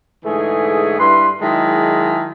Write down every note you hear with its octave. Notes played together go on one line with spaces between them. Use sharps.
G#2 D3 E3 A3 G#4
G2 E4 B4 C6
D#3 F#3 G#3 E4 G#4 A5